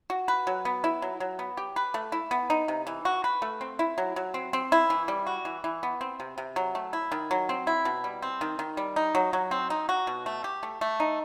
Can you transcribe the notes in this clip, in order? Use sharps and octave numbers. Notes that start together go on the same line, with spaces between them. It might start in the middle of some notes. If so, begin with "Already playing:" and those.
F#4
B4
F#3
B3
E4
F#3
F#3
B3
G4
B4
A3
E4
B3
D#4
C3
E3
F#4
B4
A3
C4
E4
F#3
F#3
C4
C4
E4
E3
G3
F#4
E3
E3
B3
C4
C3
C3
F#3
A3
E4
D#3
F#3
C4
E4
B2
G3
C4
D#3
D#3
G3
D#4
F#3
F#3
C4
D#4
F#4
B2
A3
G4
A3
A3
D#4